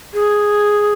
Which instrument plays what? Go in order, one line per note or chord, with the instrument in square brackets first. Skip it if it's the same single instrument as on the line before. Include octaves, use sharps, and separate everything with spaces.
[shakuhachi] G#4